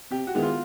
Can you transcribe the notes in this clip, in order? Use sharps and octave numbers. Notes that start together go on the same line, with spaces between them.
C3 G4
F#4
D#3 G#3 B3 E4
F4